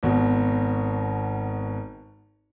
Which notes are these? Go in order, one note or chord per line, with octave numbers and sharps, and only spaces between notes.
G#1 B2